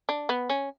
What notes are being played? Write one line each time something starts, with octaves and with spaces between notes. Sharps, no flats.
D4
B3
C#4